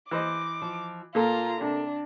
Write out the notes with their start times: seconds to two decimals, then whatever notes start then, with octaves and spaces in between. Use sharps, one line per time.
0.11 E3 C5 D#5 D6
0.62 F3
1.15 A#2 A#3 F4 A4 A#5
1.61 C3 D4